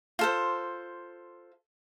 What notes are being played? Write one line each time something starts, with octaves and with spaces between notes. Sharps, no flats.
F4 A4 C5